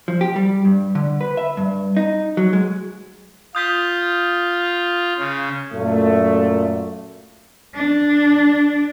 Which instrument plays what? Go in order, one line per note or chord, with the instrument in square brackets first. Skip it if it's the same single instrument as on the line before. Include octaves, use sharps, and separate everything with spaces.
[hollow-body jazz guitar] F3
G4
G3
G2
D3
B4
E5
G2
D#4
F#3
G#3
[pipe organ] F4 [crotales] D#6 G6 B6
[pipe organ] C#3
[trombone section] F#2 A#2 A3
[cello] D4